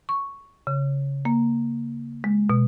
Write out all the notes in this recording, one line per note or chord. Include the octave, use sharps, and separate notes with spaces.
C#6
C#3
A#3
G#3
B2